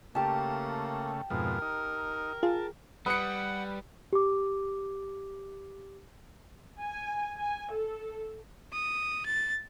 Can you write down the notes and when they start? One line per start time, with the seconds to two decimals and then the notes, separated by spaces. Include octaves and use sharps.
0.15 C#3 A3 A#3 G4 A5
1.30 F2 G#2 B2 A#4
1.62 D#4
2.43 F4 G#4 A5
3.06 G3 B4 F#5 D#6 C#7
4.13 G4 D6
6.81 G#5
7.38 G#5
7.72 A4
8.73 D#6
9.26 A6